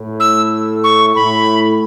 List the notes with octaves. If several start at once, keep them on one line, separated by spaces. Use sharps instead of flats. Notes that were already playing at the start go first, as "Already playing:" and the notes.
Already playing: A2
E6
C#6
A2 B5